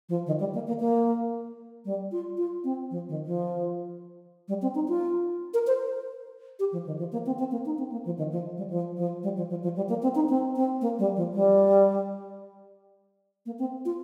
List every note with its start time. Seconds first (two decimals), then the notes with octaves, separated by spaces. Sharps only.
0.09 F3
0.27 D#3
0.40 G3
0.54 A#3
0.67 A#3
0.80 A#3
1.85 G3
2.12 F4
2.38 F4
2.64 C4
2.91 F3
3.09 D#3
3.26 F3
4.48 G3
4.62 C4
4.75 D#4
4.88 F4
5.54 A#4
5.67 C5
6.59 G4
6.72 F3
6.87 D#3
6.99 F3
7.12 A#3
7.26 C4
7.39 C4
7.52 A#3
7.66 D#4
7.79 C4
7.92 A#3
8.05 F3
8.18 D#3
8.32 F3
8.57 G3
8.70 F3
8.97 F3
9.23 G3
9.37 F3
9.50 F3
9.63 F3
9.76 G3
9.89 A#3
10.03 C4
10.15 D#4
10.29 C4
10.56 C4
10.81 A#3
10.99 G3
11.16 F3
11.34 G3
13.46 A#3
13.59 C4
13.85 F4